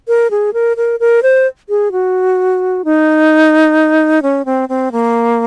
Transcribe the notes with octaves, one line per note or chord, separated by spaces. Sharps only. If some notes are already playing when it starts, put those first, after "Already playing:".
A#4
G#4
A#4
A#4
A#4
C5
G#4
F#4
D#4
C#4
C4
C4
A#3